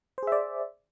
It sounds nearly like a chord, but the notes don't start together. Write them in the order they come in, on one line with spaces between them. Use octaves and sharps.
C5 G#4 E5 D5